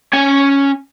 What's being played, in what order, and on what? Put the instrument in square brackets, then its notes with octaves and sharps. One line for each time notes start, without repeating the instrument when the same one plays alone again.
[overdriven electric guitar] C#4 G#5